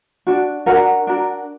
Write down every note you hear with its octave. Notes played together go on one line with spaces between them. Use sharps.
D4 F#4
D4 F#4 A#4 F#5
D4 F#4 A#4